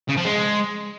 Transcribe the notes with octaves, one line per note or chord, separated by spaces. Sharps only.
C#3
F3
G#3